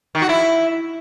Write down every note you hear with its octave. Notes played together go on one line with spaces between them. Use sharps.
D#3
F#4
E4